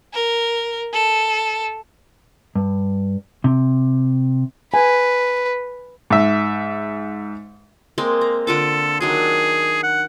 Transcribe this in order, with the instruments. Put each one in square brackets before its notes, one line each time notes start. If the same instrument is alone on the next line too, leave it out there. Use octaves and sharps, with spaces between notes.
[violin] A#4
A4
[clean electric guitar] G2
C3
[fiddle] B4 [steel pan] G#5
[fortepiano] G#2 E5
[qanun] G#3 A#3 C4
A#5
[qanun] D3 F4 D6 [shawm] A4
[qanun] D#3 F#3 D4 [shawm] G#4
[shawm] F#5